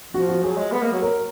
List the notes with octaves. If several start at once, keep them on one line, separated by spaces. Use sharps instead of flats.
F3 F#4
F#4
F#3 G#4
G#3
B3
A#3
F#3
A#4